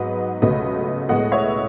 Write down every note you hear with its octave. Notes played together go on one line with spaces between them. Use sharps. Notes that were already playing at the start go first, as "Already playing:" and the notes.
Already playing: G#2 F#3 B3 B4 D#5
C#2 B2 A3 B4 D#5
A2 G#3 B3 D#5 F#5
C#5 E5